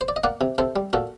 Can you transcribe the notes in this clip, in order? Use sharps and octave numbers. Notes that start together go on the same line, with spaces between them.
C5
D5
D#5
A#3 D5 F#5
C3
C3 A4 C5
G3
A#2 F#4 A4